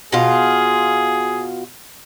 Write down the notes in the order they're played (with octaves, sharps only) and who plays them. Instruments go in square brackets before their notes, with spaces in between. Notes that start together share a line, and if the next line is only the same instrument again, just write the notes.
[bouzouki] B2 F4 [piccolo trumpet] G#4